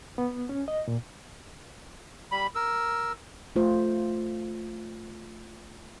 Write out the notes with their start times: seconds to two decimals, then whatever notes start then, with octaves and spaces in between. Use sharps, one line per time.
0.18 B3
0.49 C#4
0.68 D#5
0.88 A#2
2.31 G3 B5
2.55 A#4 E6
3.56 A3 F4 C5